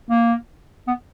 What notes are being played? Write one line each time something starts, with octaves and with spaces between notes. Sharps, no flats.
A#3
B3